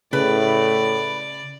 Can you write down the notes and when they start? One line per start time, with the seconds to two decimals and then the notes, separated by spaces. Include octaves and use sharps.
0.13 A2 C#3 B4 D5